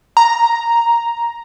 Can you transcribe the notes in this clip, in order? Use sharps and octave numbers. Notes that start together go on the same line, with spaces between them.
A#5